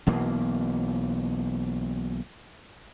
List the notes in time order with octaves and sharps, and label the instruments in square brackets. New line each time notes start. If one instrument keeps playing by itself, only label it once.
[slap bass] B1 B2 E3 A#3